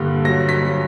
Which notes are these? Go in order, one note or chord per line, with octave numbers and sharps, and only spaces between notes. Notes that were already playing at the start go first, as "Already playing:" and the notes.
Already playing: G2 A#2 D3
F#3 A#6
B6
F#3